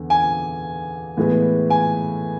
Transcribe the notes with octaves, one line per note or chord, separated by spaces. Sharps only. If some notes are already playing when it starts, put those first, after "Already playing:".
Already playing: E2 D3
G#5
A2 E3 G#3 B3
G#5